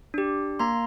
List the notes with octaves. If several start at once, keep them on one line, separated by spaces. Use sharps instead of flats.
D4 G4
A#3 A#5 C6